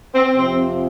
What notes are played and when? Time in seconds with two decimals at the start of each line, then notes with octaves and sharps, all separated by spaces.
0.14 C4
0.34 F2 C3 F3 C4